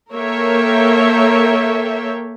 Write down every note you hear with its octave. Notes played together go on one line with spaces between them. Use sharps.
A#3 A4 A#4 C#5 E5 G5